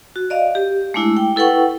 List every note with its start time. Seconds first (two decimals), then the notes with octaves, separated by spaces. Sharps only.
0.16 F#4
0.30 D5 D#5 F5
0.55 G4
0.94 G#3 A3 D4 E4
1.17 G5
1.36 E4 A4 B4 F#5 G5 C#6